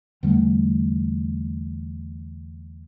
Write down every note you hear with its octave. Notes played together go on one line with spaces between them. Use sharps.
E2 D3 G3 A3